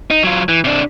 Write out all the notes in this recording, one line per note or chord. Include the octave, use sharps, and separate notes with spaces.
D#4
F#3 F4
E3
C3 D4